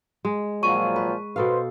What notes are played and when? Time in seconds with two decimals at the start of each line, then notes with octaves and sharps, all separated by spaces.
0.25 G#3
0.63 A#2 F3 F#3 C#6 D#7
0.96 B4
1.36 B2 A4 B4 C5 F5